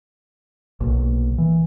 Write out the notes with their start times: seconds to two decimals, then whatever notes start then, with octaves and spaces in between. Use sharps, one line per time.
0.81 B1 A#2
1.38 E3